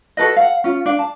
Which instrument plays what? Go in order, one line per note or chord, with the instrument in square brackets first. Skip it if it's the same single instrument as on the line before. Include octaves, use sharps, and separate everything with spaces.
[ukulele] F#4 A4 B4 D#5
F5 F#5
C#4 F4
D4 F5
A5